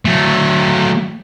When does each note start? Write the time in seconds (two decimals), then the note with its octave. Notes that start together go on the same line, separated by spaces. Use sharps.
0.05 F#3 A3